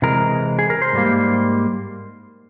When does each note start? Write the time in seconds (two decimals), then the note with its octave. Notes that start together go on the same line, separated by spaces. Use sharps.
0.02 C3 E3 G#3 A#4
0.59 G#4
0.70 A#4
0.82 C5
0.93 G#2 G3 A#3